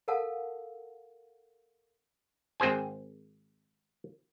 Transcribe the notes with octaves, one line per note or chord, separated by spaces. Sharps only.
A4 A#4 F5 F#5 A5
G#1 C4 G#4 C5 G#5